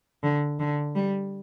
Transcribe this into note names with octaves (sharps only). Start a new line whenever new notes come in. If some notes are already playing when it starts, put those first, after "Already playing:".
D3
D3
G3